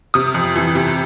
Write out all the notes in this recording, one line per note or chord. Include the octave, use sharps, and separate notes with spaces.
C3 D#6
F2
E3
C3